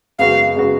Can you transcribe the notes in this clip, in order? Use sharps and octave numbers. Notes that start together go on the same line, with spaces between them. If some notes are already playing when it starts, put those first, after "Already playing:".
F#2 C#3 G#3 B3 F#4 F5
C#3 G#3 B3 F#4